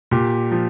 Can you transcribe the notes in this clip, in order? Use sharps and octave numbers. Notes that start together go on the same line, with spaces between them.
A#2 G4
F3